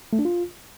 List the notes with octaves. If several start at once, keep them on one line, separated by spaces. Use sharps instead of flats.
A3
D4
F4